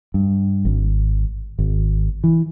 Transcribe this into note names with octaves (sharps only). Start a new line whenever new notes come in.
G2
G#1
G#1
E3